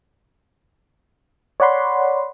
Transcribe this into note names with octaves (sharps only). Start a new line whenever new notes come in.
C#5 D5 F#5 B5 C6